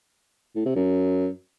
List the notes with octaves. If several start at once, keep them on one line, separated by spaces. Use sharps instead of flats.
A2
C3
F#2